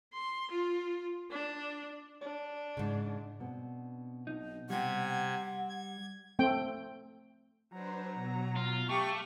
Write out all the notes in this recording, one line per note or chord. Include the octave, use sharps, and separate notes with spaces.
C6
F4
D4
D4
G#2 C#3
B2 C4 D4
B1 D#4
C3 G3 G4 F#5 G#6
G#6
A3 C4 G5
F#3 D4 B4 C5 A#5
B2
F4
A3 G4 F5 C#6